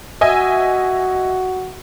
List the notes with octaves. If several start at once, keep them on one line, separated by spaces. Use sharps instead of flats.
F#4 D#5 E5 G#5